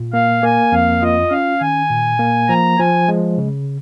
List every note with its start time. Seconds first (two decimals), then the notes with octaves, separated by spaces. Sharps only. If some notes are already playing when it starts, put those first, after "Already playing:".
Already playing: A#2 F4
0.13 A#3 F5
0.43 A#3 G#5
0.72 F2 F5
1.02 F4 D#5
1.31 C#4 F5
1.60 D#3 G#5
1.90 A#2
2.19 A#3
2.49 F3 A#5
2.78 F3 G#5
3.09 G#3
3.38 C#3